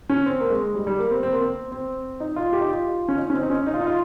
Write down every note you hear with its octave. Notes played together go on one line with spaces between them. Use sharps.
C#4
C4
A#3
G#3
G3
G3
A#3
C4
C4
A#3
C4
C4
D#4
F4
G4
D#4
F4
C#4
D#4
C#4
C4
D#4
C#4
D#4
F4
D#4
F4